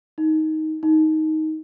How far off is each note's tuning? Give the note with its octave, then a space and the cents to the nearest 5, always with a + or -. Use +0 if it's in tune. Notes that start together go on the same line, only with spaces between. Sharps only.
D#4 +10
D#4 +10